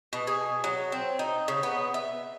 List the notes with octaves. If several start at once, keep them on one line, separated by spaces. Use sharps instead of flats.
B2
G#4
F#3
C4
D#4
C#3
B3
E5